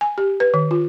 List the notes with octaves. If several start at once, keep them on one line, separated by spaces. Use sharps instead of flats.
G#5
G4
B4
D#3
F4